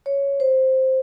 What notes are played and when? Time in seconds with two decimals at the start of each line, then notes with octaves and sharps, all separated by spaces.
0.06 C#5
0.40 C5